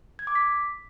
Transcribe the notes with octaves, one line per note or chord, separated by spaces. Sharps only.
G#6
D6
B6